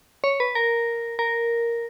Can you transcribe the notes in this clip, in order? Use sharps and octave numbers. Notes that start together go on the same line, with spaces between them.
C#5
B4
A#4
A#4